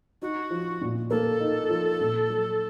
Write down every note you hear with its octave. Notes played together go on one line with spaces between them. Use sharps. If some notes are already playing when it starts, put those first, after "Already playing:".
D#4 F#4
F3
A#2
A#3 A4
D#4
F3
A#2
F#3